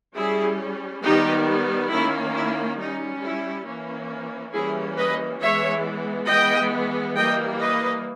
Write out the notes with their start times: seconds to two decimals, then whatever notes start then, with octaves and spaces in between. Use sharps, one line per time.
0.15 G3 C#4 E4 G#4
1.03 D#3 G3 B3 D#4 G4
1.90 D#3 A#3 C#4 E4
2.34 E4
2.78 G3 C#4 D#4
3.22 E4
3.66 E3 A#3 C#4
4.53 E3 G3 A#3 C#4 E4 G#4
4.97 B4 D#5
5.41 E3 G#3 B3 C#5 E5
6.28 E3 G#3 B3 D#5 G5
7.16 E3 G3 A#3 D#5 G5
7.60 B4 D#5